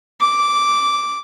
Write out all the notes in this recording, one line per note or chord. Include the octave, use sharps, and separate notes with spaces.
D6